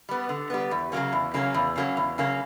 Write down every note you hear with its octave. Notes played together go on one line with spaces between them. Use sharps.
G3 B3
D3
G3 B3
E2
C#3 F#3 A#3 C#4
E2
C#3 F#3 A#3 C#4
E2
C#3 F#3 A#3 C#4
E2
C#3 F#3 A#3 C#4